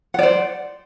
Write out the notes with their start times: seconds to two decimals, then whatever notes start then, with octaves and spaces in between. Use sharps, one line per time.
0.14 F#5
0.19 D5
0.23 C5